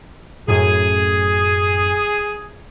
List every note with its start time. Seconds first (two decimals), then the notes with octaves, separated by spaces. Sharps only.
0.48 F#2 A2 G#4